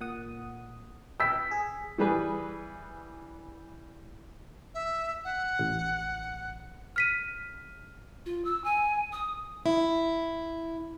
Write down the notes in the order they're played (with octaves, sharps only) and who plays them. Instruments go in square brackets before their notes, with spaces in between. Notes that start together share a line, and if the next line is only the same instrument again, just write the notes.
[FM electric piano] A#2 F#5 D#6
[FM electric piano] G5 [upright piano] E6 B6
[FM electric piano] G#4
[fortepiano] E3 G3 G#4 B4
[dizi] E5
F#5
[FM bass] A1
[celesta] F6 B6 D#7
[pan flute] F4
E6
G#5
D#6
[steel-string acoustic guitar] E4